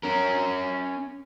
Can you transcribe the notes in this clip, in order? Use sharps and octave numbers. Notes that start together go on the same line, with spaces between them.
C#4 A#4